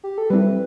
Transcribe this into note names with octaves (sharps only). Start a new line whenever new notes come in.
G4
A4
G3 C4 E4 B4